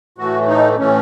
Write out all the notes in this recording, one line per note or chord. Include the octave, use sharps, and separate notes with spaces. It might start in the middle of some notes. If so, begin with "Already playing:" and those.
A2 E3 A3 F#4
D#4
A2 E3 A3 C#4